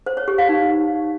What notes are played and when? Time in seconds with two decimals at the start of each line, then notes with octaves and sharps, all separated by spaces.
0.06 C5
0.17 C#5
0.28 G4
0.38 F5
0.49 D#4